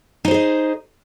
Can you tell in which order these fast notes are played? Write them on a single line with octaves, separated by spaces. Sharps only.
D#4 C5 G#4 D#5